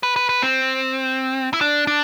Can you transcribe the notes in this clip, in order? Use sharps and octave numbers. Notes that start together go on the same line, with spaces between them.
B4
B4
B4
C4
E4
D4
D4